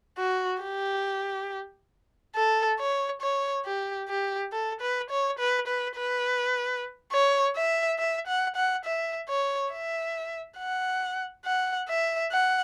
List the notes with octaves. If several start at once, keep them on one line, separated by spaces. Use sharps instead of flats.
F#4
G4
A4
C#5
C#5
G4
G4
A4
B4
C#5
B4
B4
B4
C#5
E5
E5
F#5
F#5
E5
C#5
E5
F#5
F#5
E5
F#5